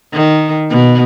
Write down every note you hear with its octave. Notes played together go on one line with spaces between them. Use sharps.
D#3
B2